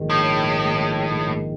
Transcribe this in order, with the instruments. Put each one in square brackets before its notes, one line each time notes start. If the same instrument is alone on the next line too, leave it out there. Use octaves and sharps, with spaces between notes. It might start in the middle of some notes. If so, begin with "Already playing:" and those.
Already playing: [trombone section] A#1 G#2 D#3
[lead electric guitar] A2